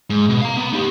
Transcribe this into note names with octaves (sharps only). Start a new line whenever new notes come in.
G#2
B2
F5 A#5
B3
D#4 G4